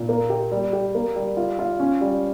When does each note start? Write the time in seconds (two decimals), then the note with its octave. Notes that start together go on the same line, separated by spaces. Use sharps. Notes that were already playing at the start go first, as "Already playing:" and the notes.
Already playing: A#2
0.09 A#3
0.30 G4
0.52 G3
0.73 G4
0.95 A#3
1.16 G3
1.37 F4
1.59 F4
1.80 C#4
2.01 G3